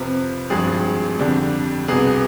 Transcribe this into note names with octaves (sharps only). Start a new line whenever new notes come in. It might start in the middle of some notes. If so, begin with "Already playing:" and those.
Already playing: F2 C3 F3 B4
G#1 G2 F3 G#3 G#4
F2 D3 G3
C2 B2 B3 G#4